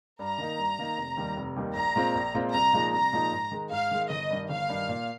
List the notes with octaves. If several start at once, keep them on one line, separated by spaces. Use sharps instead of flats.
G2 A#5
D#3 A#3 D#4
G2
D#3 A#3 D#4
F1
D#2 D#3 G3
F1
D#2 D#3 G3
A#1 A#5
A#2 G#3 C4 F4
A#1
A#2 G#3 C4 F4
C2 A#5
A#2 F3 G#3 D#4
C2 A#5
A#2 F3 G#3 D#4
G#2
D#3 G#3
G#2 F5
D#3 G#3
G1 D#5
G2 D#3
G1 F5
G2 D#3
A#2